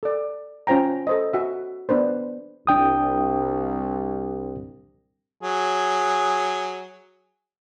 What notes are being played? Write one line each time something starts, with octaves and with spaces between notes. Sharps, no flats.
A4 D5
C#4 F4 C5 G5 A#5
A4 C5 D#5
F#4 E5
B3 D4 B4 C5
C2 D4 G5 D#6
F#3 G#4